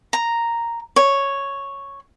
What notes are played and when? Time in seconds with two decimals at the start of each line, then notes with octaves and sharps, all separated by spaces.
0.13 A#5
0.96 C#5